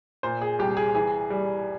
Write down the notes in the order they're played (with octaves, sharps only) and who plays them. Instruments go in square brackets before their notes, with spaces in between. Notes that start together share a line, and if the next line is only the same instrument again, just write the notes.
[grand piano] A#2 C5
G#4
C2 G4
G#4
E3 G#4
G3